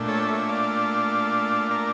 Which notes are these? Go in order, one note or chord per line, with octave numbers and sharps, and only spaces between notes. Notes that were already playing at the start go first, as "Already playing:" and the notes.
Already playing: A#2 A3 D4
A4 C#5
C#5 E5
D5 F5
A#4 D5